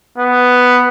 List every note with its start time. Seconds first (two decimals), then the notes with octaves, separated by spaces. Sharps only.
0.18 B3